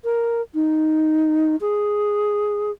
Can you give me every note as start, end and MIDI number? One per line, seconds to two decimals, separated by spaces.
0.04 0.41 70
0.54 1.56 63
1.61 2.71 68